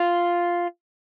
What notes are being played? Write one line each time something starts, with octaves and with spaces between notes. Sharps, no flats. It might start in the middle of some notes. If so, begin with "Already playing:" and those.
Already playing: F4